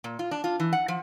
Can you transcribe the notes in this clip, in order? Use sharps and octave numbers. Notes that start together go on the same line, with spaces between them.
A#2
F4
D4
F4
E3
F#5
F3